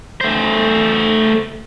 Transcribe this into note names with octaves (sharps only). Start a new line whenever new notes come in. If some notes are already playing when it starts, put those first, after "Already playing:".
A3 C5